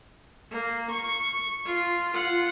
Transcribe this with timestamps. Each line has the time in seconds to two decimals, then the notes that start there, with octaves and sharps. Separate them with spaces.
0.51 A#3
0.90 C#6
1.65 F4
2.13 F4 F#5